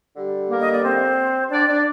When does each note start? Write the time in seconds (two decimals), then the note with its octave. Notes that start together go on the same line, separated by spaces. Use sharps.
0.17 D3 G3
0.50 A#3 A#4
0.62 D#5
0.73 D5
0.84 C4 C5
1.51 D4 D5
1.68 D4 D5